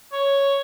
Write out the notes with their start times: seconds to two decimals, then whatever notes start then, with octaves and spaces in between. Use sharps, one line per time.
0.13 C#5